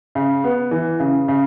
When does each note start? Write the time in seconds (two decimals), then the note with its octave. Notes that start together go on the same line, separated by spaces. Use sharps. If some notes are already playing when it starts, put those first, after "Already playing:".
0.15 C#3
0.44 B3
0.71 E3
1.00 C#3
1.28 C#3